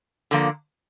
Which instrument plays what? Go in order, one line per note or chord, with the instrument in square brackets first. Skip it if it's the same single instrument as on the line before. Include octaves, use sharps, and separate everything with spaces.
[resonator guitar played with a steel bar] D3 F3 A#3